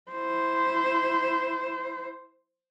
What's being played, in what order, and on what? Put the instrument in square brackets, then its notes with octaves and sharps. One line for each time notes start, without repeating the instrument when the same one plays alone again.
[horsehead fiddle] E4 C5